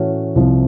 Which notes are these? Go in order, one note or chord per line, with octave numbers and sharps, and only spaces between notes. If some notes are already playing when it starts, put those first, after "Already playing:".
Already playing: A2 E3 A3 C#4 F#4
C2 C3 F3